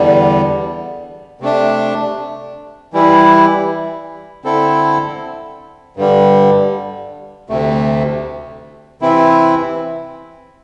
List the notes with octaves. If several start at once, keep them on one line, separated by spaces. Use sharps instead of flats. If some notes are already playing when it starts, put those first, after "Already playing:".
Already playing: E2 D3 G3
C3 A3 D4
E3 G3 E4
D3 C4 E4 A4
G2 D3 G3
D2 C3 A3
C3 E3 C4 E4